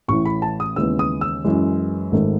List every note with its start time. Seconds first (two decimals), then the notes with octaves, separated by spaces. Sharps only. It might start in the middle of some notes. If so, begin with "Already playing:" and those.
0.08 A1 A2 E3 C#6
0.25 B5
0.42 A5
0.60 D#6
0.76 D#2 C#3 E3 G#3 B3 E6
0.99 D#6
1.21 E6
1.45 F#2 E3 G#3
2.12 G#1 G#2 D#3 A3